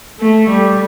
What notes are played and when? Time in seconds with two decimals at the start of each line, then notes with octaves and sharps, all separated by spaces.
0.20 A3
0.49 G3